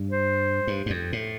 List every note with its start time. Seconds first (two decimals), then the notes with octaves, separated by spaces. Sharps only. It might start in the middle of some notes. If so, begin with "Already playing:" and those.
Already playing: G2
0.11 C5
0.67 G2
0.86 G2
0.90 F2
1.13 A2